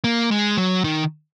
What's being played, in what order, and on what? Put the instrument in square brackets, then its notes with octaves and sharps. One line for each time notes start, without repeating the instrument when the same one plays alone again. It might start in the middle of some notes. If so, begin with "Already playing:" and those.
[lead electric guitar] A#3
G#3
F#3
D#3